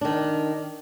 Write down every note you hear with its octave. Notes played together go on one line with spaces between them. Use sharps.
D#3 D4